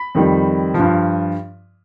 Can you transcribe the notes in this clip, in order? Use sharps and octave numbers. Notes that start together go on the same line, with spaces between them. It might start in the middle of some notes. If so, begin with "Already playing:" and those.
Already playing: B5
F2 D#3 G3
F3
G2